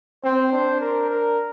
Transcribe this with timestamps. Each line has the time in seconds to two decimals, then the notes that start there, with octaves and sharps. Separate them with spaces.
0.24 C4 C5
0.53 D4
0.81 A#4
1.09 A#4